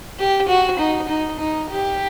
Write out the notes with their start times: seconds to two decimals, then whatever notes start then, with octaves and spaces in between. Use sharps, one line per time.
0.19 G4
0.48 F#4
0.79 D#4
1.09 D#4
1.39 D#4
1.70 G4